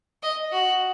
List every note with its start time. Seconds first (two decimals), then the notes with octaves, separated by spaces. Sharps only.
0.23 D#5
0.53 F#4